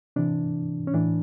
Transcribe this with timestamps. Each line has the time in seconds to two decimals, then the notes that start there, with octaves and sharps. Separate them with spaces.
0.16 C3 E3 D4
0.87 C#4
0.94 A2 E3 D4